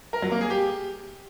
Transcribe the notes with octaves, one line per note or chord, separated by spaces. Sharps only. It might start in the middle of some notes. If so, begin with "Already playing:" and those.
A#4
F#3
A#3
G#4
G4